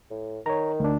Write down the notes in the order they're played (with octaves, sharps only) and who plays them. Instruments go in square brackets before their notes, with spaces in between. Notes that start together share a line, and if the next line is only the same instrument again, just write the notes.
[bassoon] A2
[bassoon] D#3 [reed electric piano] C#5 A#5
[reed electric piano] D2 D4